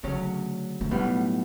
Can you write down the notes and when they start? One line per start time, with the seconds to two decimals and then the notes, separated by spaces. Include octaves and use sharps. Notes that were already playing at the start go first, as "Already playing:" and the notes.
0.03 D2 C#3 F#3 A3 C#4
0.81 A3
0.91 B1 A2 G3 B3